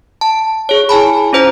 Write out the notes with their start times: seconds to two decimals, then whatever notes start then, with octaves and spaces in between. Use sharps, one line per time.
0.21 A5
0.69 G#4 C#5
0.89 E4 G#5 A5 B5
1.33 C#4 F4 C5 A#5